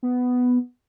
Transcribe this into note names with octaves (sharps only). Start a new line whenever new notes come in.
B3